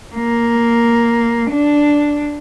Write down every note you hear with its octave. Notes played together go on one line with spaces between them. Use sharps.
A#3
D4